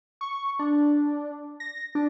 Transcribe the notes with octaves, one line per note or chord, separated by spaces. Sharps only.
C#6
D4
A#6
D4